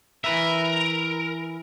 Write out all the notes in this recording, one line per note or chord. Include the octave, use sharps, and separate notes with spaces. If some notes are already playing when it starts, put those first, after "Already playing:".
E3 A#4 B4 E5